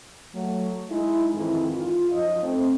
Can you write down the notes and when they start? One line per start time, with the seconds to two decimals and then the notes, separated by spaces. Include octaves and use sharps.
0.34 F#3 A3
0.90 G#3 D#4 E4
1.35 F2 G#2 D#3 E3 E4 G#4
1.74 F4
2.13 F#2 F3 D#4 D#5
2.42 A3 C4